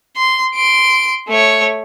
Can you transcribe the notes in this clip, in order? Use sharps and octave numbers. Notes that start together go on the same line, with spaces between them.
C6
C6 D7
A3 C#5